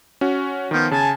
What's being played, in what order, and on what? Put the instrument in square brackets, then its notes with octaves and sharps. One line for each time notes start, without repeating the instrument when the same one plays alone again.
[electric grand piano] C#4 F#4
[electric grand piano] D#3 B3 [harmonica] F3
[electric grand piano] C#3 [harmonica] G#5 A5